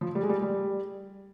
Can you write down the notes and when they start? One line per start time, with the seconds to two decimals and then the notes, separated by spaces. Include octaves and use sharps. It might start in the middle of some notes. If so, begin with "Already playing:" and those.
0.01 F3
0.15 G3
0.23 G#3
0.29 G3
0.42 G3